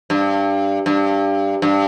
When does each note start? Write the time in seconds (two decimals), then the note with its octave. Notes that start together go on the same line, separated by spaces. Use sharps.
0.10 G2
0.86 G2
1.62 G2